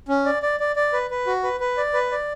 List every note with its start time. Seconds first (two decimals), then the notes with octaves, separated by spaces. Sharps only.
0.08 C#4
0.26 D5
0.42 D5
0.60 D5
0.76 D5
0.93 B4
1.10 B4
1.27 F#4
1.43 B4
1.60 B4
1.78 D5
1.93 B4
2.11 D5